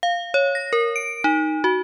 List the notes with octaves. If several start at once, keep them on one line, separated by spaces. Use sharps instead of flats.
F5
C#5
A#6
A#4
D7
D#4
F#4